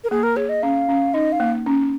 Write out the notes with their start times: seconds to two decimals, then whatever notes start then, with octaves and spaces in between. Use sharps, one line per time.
0.04 A#4
0.10 A#3 G#4
0.23 A#4
0.36 G#4 C#5
0.49 D#5
0.62 C#4 F5
0.89 C#4
1.14 D#4 D#5
1.32 F5
1.40 A#3
1.66 C#4